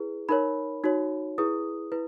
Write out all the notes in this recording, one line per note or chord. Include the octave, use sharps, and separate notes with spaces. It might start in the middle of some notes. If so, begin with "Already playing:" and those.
Already playing: E4 G#4 B4
D#4 A#4 C#5 B5
D#4 F#4 C#5
E4 G#4 B4 D#6
E4 B4